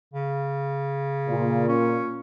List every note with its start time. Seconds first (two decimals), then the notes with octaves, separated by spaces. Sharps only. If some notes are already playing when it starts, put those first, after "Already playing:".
0.13 C#3
1.28 A#2
1.68 C#4